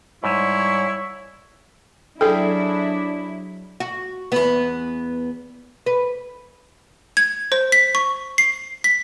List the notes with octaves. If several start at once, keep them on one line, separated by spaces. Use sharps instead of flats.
G#2 G3 E4 C#5
F#3 D4 E4 G#4 A4 G5
F#4
E2 B3
B4
G#6
C5
B6
C#6
C7
B6